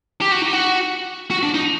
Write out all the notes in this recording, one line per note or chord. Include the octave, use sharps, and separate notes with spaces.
G4
F#4
D#4
F#4
F#4
D4
D#4